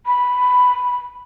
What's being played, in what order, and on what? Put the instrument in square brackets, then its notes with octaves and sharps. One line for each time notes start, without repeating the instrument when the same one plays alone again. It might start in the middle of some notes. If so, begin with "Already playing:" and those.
[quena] B5